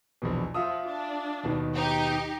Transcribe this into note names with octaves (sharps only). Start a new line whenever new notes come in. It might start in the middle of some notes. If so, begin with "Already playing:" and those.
A#1 E2 B2
F3 F4 E5 D#6
D4
D#2 B2 D#3
D#4 G4